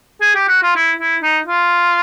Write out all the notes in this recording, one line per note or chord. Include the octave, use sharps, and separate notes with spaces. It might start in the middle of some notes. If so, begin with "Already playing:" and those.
G#4
G4
F#4
F4
E4
E4
D#4
F4